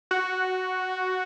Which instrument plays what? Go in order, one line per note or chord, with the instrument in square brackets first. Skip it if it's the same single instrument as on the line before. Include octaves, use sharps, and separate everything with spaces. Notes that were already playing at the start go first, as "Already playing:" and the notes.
[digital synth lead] F#4